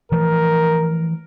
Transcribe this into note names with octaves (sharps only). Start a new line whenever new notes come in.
E3 F3 A3 A#4